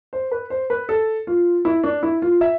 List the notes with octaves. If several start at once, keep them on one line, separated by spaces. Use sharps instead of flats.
C5
B4
C5
B4
A4
F4
E4
D4
E4
F4
E5